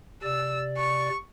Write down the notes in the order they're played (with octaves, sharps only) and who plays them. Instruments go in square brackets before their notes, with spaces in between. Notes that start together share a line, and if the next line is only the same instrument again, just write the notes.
[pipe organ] C3 D5 [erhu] E6
[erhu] C#6